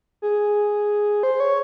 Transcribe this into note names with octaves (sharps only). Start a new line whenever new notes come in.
G#4
C5
C#5